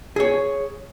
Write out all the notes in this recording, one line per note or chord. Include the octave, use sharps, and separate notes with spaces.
G#4 C#5